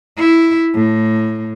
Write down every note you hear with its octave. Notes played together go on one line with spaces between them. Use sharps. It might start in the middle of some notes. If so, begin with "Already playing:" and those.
E4
A2